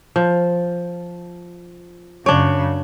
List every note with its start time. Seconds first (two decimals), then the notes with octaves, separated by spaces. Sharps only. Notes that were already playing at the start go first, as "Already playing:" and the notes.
0.16 F3
2.26 F#2 C#3 D4 C#5